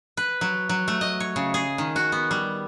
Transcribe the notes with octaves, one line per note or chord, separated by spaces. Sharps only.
B4
F#3
F#3
A3
D#5
C#5
C#3
G#4
D#3
F#4
B3
G3